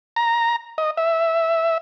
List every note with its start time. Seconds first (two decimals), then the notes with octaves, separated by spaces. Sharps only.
0.16 A#5
0.78 D#5
0.97 E5